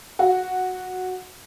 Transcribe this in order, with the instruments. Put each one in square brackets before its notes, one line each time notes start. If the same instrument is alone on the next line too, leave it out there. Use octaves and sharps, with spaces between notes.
[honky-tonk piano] F#4